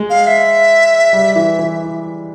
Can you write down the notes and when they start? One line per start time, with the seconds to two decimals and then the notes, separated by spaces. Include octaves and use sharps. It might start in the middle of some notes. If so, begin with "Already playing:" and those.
Already playing: G#3
0.10 F5
0.27 E5
1.13 G3
1.36 E3
1.59 E3